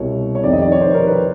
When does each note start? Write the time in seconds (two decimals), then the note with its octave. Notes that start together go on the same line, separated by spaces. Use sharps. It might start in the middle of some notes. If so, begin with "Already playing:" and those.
Already playing: C2 B2 C#5
0.35 C#5
0.44 F1 F2 C3 D#3 D5
0.53 D#5
0.62 D5
0.72 C#5
0.81 C5
0.94 A#4
1.07 B4